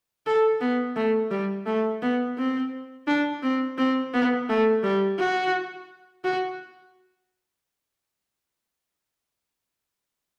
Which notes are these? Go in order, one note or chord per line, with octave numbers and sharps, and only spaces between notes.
A4
B3
A3
G3
A3
B3
C4
D4
C4
C4
B3
A3
G3
F#4
F#4